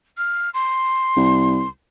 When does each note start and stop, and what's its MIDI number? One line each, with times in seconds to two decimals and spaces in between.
0.18 0.50 89
0.54 1.69 84
1.16 1.63 36